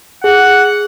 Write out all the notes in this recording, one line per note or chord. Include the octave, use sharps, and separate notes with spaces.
G#4 F#5